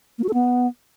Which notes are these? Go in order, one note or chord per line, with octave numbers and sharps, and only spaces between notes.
A#3
F#4
A4
B3